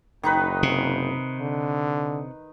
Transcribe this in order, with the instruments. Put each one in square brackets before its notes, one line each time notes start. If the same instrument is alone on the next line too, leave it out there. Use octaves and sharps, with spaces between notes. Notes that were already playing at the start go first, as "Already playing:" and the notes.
[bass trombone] F#1 [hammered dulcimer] D#3 D#4 B4
[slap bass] C3
[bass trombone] D3